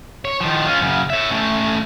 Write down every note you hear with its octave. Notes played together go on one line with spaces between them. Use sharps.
C#5
D#3 F3
C#4 F4
F#2 C#3
C#5 E5
A3 C#4